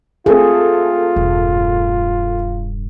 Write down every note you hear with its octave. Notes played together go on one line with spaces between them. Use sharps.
A3 C4 F4 G#4 A4
E1 G2